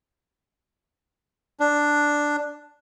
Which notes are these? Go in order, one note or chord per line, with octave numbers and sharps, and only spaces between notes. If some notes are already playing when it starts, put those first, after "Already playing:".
D4